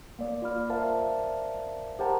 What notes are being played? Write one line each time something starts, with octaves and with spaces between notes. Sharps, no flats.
A#3 D5
F4 D5 B5 F6
A#4 C5 D5 E5 F5 A5
G4 A#4 C5 F#5 A5 A#5